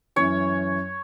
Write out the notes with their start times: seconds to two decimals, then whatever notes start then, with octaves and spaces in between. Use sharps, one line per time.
0.16 F#2 E3 C#4 C#5